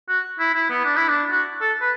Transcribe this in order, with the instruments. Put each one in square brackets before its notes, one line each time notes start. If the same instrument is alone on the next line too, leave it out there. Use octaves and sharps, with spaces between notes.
[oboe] F#4
E4
E4
B3
D4
E4
D4
F#4
A4
B4